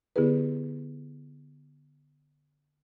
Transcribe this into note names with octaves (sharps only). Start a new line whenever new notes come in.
D3 B3 E4 G4 G#4 B4